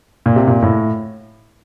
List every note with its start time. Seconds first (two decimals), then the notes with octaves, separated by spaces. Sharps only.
0.26 A#2
0.36 C3
0.47 A#2
0.62 A2